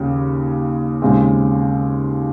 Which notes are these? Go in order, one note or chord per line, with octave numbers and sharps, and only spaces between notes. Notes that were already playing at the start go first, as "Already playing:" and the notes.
Already playing: D#2 C#3 G3
D#2 C#3 G#3 C4